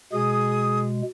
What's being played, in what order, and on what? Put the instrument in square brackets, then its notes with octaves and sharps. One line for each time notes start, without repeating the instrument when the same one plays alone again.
[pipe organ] B2 G#3 [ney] G#4 [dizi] D#6